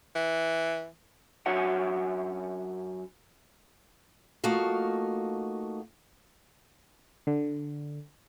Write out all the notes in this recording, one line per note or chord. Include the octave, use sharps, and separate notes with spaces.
E3
F#2 D4 F#4 C#5 E5 F#5
F3 A3 A#3 D#4 F#4 F5
D3